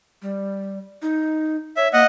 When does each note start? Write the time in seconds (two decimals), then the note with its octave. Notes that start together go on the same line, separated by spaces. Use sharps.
0.22 G3
1.02 D#4
1.77 C#5 E5
1.93 A#3 D#5 F#5